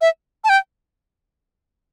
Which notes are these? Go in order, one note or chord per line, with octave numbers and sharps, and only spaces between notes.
E5
A5
G5